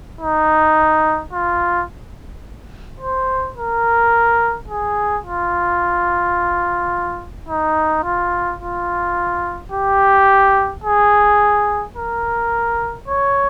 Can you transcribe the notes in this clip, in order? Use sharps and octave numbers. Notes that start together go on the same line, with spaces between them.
D#4
F4
C5
A#4
G#4
F4
D#4
F4
F4
G4
G#4
A#4
C#5